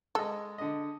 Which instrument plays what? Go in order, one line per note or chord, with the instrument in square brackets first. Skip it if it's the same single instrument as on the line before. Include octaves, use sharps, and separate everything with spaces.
[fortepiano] G#3 D#5 [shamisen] A4
[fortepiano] D3 D#5